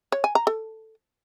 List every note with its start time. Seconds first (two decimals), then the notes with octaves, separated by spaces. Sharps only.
0.12 C#5
0.24 G#5
0.35 A#5
0.47 A4